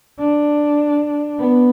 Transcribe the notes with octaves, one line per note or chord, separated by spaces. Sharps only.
D4
B3